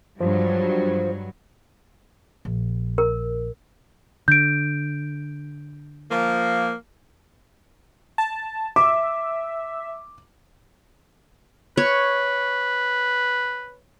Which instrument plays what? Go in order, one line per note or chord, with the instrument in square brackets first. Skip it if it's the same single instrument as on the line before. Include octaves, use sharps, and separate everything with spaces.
[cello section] G2 F#3 [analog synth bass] F3
[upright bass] A#1
[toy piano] A#4
[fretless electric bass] D3 [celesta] G6 D7
[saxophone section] F3 A#3
[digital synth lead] A5
[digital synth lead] E5 [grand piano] D6
[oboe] B4 [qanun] C#5